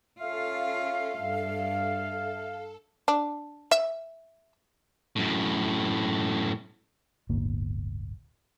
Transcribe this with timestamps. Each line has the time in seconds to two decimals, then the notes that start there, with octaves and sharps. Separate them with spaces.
0.20 C#4 F4 A4 E5 F5
1.19 G2
3.08 D4
3.71 E5
5.16 F#2 A2
7.29 D1 G1 B2 A#3